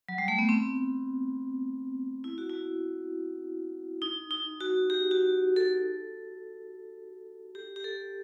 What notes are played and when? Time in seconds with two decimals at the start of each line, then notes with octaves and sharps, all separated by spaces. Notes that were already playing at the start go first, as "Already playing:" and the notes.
0.09 F#3
0.18 G3
0.28 A3
0.39 B3
0.49 C4
2.24 E4
2.38 F#4
2.50 E4
4.02 D#4
4.31 D#4
4.61 F#4
4.90 G4
5.11 F#4
5.56 A4
7.55 G4
7.76 G4
7.84 A4